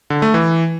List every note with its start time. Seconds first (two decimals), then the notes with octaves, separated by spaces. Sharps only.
0.10 D3
0.22 A3
0.34 E3